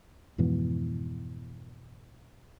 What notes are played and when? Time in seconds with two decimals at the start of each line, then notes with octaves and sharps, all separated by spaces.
0.38 F2 G#2 B2 E3